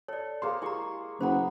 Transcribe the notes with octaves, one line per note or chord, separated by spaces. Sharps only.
A4 C#5 D5
A#3 G#4 C5 F5 C6
G#3 E4 G4 A#5 C#6
F#1 G#3 B3 C5 A#5 B5